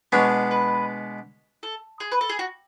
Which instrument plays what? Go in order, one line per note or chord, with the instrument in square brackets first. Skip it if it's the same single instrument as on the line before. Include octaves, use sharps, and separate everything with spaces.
[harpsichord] B2 G#3 B3 D4 [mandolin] C#5
[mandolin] B4
A4
G#4
B4
A4
G#4
F#4